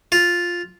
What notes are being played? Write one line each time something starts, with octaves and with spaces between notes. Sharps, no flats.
F4